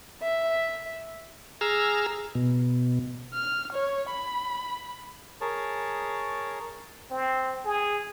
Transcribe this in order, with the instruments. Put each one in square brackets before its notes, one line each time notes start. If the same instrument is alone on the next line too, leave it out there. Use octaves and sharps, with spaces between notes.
[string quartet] E5
[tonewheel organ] G#4 A#5 E6 F6
B2
[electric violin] F6
C#5
B5
[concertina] G#4 A#4 C#5 A5
[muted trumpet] C4
G#4